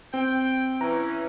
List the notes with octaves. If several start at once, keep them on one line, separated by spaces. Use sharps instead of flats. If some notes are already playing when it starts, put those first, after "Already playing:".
C4 G5
E3 C#4 A#5